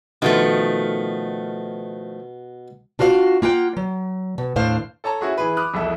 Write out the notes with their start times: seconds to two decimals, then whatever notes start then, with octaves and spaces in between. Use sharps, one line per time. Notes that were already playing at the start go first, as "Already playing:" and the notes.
0.22 B2 D#3 F3 A3
2.99 D4 F4 F#4 C5 F5
3.42 A#3 F4 F#5 G5
3.77 F#3
4.38 B2
4.56 D#2 A2 D4 C5 F5
5.04 A4 C#5 A5 A#5
5.21 C#4 E4 F#4 G#4
5.37 E3 G#4 B4
5.57 B5 D6 D#6 F6 F#6
5.74 E1 C2 F2 E4 A4 E5